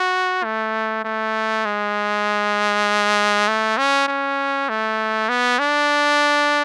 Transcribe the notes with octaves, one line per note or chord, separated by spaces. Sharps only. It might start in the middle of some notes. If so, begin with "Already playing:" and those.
Already playing: F#4
A3
A3
G#3
A3
C#4
C#4
A3
B3
D4